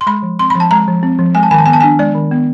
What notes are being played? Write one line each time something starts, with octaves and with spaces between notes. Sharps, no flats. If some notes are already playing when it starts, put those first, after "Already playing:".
C6
G#3 B5
F3
C4 C6
B5
F3
A5
G#3 A#5
F3
C4
F3
G#3 G#5
A5
D#3 G#5
A5
B3 G#5
A5
D4 G#5
G#3 D5
D#3
B3